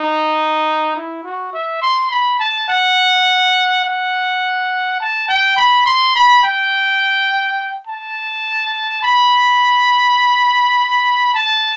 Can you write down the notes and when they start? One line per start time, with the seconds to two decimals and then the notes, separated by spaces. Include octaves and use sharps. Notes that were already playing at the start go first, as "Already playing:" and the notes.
Already playing: D#4
0.95 E4
1.24 F#4
1.53 E5
1.82 C6
2.11 B5
2.39 A5
2.68 F#5
3.84 F#5
5.00 A5
5.28 G5
5.57 B5
5.86 C6
6.15 B5
6.43 G5
7.87 A5
9.03 B5
11.34 A5